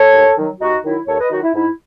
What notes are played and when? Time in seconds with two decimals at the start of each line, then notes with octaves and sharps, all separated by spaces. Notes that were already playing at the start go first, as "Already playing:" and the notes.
Already playing: A4 C#5
0.14 D#2
0.37 D#3 F#3
0.60 D#2 D#4 F#4
0.84 D#3 F#3 E4
1.07 D#2 A4 C#5
1.19 B4 D#5
1.31 D#3 F#3 D#4 F#4
1.42 E4
1.54 G#2 E4